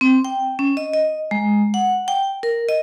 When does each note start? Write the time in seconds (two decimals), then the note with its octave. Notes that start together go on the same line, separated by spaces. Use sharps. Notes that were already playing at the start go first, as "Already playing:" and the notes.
0.01 C4
0.25 G5
0.59 C#4
0.77 D#5
0.93 D#5
1.31 G#3
1.74 F#5
2.08 G5
2.43 A#4
2.69 D#5